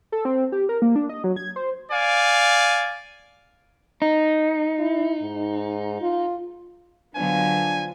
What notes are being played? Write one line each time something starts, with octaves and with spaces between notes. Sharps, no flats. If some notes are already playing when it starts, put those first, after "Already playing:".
A4
C4
G4
A#4
A#3
D4
D#5
F#3
G#6
C5
D5 F5 G#5
D#4
E4
G#2
F4
D3 F3 F#3 B3 D4 G#5